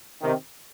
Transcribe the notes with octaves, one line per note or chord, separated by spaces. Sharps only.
C3 D#3